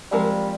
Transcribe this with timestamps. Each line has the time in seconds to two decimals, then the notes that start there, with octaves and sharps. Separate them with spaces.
0.11 F3 G3 G#3 C4 F4 A#4